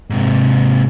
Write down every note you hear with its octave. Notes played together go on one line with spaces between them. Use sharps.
G#2 C3